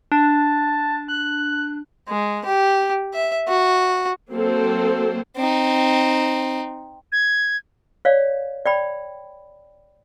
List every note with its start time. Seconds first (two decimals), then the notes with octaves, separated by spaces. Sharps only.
0.12 D4 A5
1.08 F#6
2.09 G#3
2.46 G4
3.14 E5
3.49 F#4
4.32 F#3 A#3 C4 A4 C5
5.36 C4 D#4
7.12 G#6
8.05 C#5 D5 F5
8.66 D5 G5 B5